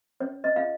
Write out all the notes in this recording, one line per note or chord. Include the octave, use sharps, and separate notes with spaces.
C#4 C#5
D#5
F4 G#4 F5